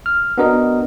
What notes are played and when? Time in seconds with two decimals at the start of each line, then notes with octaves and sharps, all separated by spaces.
0.06 F6
0.38 B3 D4 F#4 A#4 D#5